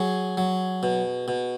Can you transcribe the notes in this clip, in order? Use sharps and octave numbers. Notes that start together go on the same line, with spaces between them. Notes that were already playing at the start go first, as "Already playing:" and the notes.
Already playing: F#3 G#4
F#3
B2
B2